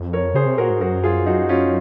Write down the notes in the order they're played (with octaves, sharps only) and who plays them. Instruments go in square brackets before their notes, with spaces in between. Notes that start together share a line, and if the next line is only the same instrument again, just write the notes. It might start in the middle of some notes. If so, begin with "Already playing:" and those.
Already playing: [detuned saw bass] F2
[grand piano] A#4 C#5
[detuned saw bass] C#3 [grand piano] G#4 C5
[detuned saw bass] C3
[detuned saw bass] A#2 [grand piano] F#4 A#4
[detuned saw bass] G#2
[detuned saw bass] F#2 [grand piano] F#4 A#4
[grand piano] F4 G#4
D#4 F#4
F#4
C#4 F4